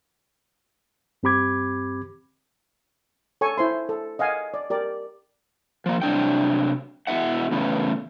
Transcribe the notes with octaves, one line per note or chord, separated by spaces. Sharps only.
G2 C4 G4 B5 D6 G#6
A4 C#5 G#5 C#6
E4 C5 C6
A4
D#5 F5 F#5 G#5
D5
G4 A#4 D5
F3 A#3
C3 F#3 D4 G5
B2 E3 E4 E5 F#5
A2 C#3 E3 B3